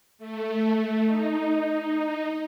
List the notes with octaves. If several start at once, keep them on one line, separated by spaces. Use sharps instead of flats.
A3
D#4